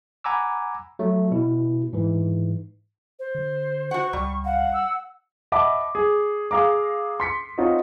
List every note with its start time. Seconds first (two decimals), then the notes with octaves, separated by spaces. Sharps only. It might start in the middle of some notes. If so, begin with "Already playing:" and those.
0.24 F#5 G#5 A#5 B5 D6 E6
0.99 F#3 A3
1.31 B2 E4
1.93 G#2 E3
3.19 C5
3.35 D3
3.91 F#4 F#5 C#6
4.13 C#2 G3
4.45 F5 F#5
4.73 E6
5.52 D#5 E5 F#5 A5 B5 D6
5.95 G#4
6.51 G#4 F5 A#5 D6
7.20 C6 B6 C#7
7.58 C4 D#4 F4 F#4 C#5 D#5